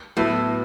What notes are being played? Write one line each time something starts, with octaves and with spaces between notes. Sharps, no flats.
A2 F#3 B3 E4 A4